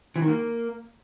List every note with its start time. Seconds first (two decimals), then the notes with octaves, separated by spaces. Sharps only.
0.16 E3
0.22 D#3
0.28 A#3